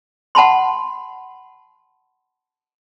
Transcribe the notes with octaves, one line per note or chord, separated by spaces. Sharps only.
F#5 A5 B5 C6